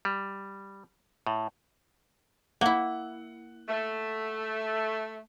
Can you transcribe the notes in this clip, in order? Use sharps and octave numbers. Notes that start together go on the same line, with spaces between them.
G3
A2
A#3 E4 F#5
A3